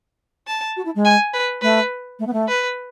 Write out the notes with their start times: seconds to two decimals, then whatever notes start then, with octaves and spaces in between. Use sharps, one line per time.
0.47 A5
0.76 F#4
0.85 E4
0.95 G#3
1.05 G#5
1.33 B4
1.62 A3 B4
2.19 A3
2.27 B3
2.33 A3
2.48 B4